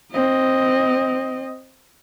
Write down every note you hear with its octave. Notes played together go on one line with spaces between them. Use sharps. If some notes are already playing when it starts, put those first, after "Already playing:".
C4 D#5